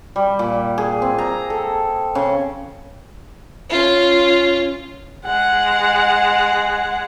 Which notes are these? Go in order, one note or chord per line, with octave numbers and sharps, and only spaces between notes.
G3
A#2
G#4
C4
A#5
A4
C#3
C#4 F4
G#3 F#5